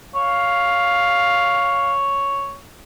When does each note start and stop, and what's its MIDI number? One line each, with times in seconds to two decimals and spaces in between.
0.15 2.59 73
0.15 1.95 77